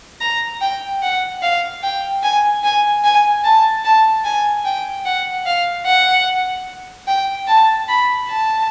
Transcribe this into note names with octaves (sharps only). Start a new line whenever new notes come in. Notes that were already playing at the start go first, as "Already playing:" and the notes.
A#5
G5
F#5
F5
G5
G#5
G#5
G#5
A5
A5
G#5
G5
F#5
F5
F#5
G5
A5
B5
A5